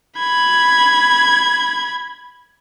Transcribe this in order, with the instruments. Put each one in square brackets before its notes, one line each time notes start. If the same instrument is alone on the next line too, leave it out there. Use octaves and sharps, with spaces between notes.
[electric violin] B5 G#6